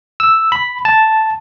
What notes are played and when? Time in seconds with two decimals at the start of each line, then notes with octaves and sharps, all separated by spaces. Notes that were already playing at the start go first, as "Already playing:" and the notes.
0.20 E6
0.52 B5
0.85 A5